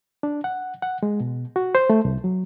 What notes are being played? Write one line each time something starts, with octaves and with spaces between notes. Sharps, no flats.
D4
F#5
F#5
G#3
B2
F#4
C5
A3
C2
F#3